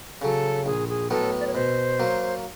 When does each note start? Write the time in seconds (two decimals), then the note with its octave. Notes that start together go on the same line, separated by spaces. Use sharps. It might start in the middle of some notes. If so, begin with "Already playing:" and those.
0.22 C#3 F#3 A4
0.66 A#1 G#4
0.89 G#4
1.11 A2 F#3 B3 A4
1.40 D5
1.47 C#5
1.54 B2 C5
2.00 F#3 A#3